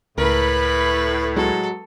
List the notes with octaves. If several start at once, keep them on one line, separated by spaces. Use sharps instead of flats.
C#2 A2 A#4 B4 B5
F#3 G#3 A4